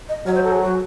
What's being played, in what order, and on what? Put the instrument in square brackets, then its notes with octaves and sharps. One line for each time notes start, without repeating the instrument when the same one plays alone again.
[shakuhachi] D#5
[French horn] F#3 [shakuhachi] C#5
[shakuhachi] C5
A4
G#4
F#4